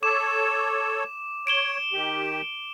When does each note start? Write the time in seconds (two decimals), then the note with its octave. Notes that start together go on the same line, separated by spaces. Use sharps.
0.03 A4 C#5 D6 E7
1.47 C#5 D7 E7 G7
1.93 D#3 G4